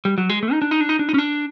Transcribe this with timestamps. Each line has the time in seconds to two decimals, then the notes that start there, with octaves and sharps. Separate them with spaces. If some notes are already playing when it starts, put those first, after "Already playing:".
0.05 G3
0.18 F#3
0.30 G#3
0.43 A3
0.52 D#4
0.62 D4
0.71 D#4
0.81 D4
0.89 D#4
0.99 D4
1.09 D#4
1.14 C#4
1.18 D4